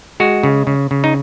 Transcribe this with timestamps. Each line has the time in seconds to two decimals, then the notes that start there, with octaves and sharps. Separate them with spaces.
0.20 G#3 F#4
0.43 C#3
0.67 C#3
0.91 C#3
1.04 D#4